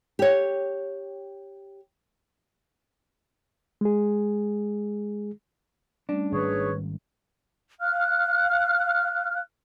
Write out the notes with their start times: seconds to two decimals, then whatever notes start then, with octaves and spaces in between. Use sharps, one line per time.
0.19 G4 C#5
3.81 G#3 G#4
6.09 G3 A3 C#4 D4
6.32 G#1 D#3 G#4 B4 C#5
7.81 F5 F6 F#6